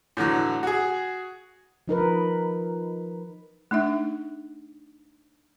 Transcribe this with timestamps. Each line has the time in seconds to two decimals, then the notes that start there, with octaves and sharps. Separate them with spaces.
0.17 A2 D3 E3 F#3
0.63 F#4 G#4
1.88 F3 D#4 A#4 B4
3.71 A3 D4 D#4 E5